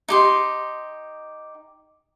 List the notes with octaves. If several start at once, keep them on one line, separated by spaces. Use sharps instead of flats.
D#4 G4 C6